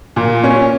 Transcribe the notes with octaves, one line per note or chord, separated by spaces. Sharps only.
A#2
C#4